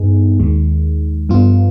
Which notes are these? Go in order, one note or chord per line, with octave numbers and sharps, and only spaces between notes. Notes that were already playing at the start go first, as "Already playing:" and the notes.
Already playing: G2 B3 D#4 G#4
D#2 D#3 G#3
G2 F3 B3 F4